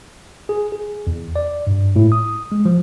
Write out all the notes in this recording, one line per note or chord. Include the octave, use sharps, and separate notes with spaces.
G#4
G#4
E2
D5
G2
A2
D#6
G#3
F3